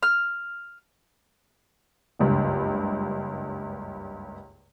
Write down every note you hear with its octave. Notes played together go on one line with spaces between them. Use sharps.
F6
F#1 C#2 G2